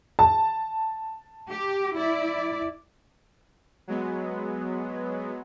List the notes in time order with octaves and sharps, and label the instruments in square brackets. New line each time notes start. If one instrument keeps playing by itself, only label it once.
[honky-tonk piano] A5
[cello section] G4
E4 D5
[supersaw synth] F#3 G#3 B3